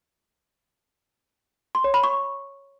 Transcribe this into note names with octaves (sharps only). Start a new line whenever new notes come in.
C6
C#5
B5
C#6